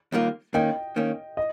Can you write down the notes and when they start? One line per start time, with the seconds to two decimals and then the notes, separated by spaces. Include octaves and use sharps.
0.12 D#2 D#3 G3 A#3 F4
0.54 D#3 A#3 C#4 D#5 G5
0.96 D#3 A#3 C#4
1.37 D#5